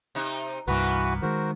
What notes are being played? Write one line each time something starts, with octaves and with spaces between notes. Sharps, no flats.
C3 D#4
C2 G2 E3 A#3 B3 F#4 B4
D#3 G#3 F#4 A#4 C5